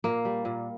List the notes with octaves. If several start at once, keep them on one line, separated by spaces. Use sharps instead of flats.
A#2 A#3
G3
A#2